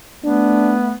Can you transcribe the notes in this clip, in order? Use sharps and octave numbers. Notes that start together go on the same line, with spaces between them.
A3 B3 D4